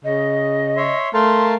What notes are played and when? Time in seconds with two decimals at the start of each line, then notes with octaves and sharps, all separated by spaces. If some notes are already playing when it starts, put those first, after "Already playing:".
0.05 C#3 D#5
0.77 C#5 E5 C6
1.14 A3 A#4 F5 A5 C6